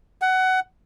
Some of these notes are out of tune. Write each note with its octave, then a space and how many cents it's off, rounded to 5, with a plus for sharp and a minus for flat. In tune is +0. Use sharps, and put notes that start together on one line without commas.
F#5 +15